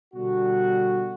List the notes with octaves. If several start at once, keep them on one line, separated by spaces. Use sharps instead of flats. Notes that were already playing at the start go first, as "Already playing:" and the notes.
B2 D3 G3 F#4